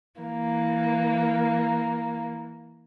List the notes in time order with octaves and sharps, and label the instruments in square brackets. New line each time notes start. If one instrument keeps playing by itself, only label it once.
[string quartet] E3 A#3